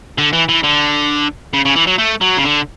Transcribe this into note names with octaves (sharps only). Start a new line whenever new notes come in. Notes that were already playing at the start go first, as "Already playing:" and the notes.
D3
E3
E3
D3
C#3
C#3
E3
F#3
A3
F#3
C#3
D3